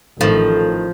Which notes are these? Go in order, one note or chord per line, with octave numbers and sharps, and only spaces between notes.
A1 A2 D#3 F3 A4